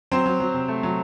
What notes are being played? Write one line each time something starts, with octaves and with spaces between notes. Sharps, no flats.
F#3 C4 C5
F#3
F#3
C3
A3
F#3